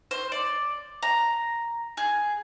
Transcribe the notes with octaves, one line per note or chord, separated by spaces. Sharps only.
C5
D5
A#5
G#4